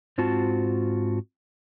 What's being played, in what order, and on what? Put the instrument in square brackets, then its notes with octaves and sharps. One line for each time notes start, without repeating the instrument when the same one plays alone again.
[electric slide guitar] G#2 C4 F4 F#4 A5